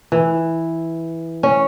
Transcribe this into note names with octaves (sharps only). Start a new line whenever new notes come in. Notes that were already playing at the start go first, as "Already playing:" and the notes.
E3
C#4